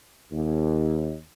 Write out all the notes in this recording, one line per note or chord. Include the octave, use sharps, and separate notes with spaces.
D#2